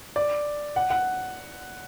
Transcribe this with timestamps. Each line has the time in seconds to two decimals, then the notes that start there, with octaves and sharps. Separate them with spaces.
0.16 D5
0.76 F#5
0.90 F#5